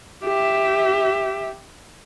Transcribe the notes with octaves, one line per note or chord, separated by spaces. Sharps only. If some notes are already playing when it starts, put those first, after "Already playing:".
G4 E5